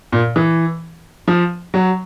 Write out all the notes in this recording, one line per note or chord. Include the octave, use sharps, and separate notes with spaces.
A#2
E3
F3
F#3